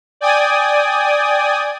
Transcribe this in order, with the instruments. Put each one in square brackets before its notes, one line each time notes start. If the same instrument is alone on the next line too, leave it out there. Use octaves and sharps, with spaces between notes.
[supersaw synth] D5 G5 G#5 D#6